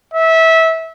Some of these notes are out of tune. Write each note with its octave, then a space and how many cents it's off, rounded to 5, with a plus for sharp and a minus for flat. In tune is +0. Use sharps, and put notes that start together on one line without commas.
E5 -20